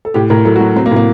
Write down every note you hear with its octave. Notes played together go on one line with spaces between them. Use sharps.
A4
A2 G4
A2 A#4
F#3 A4
F#4
F#3
F#3 C4
A#3
A2
A#3